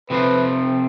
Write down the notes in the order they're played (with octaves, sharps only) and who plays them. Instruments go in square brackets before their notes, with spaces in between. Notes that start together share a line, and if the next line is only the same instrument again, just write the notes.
[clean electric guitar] C3 F3 A3 C4 [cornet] B4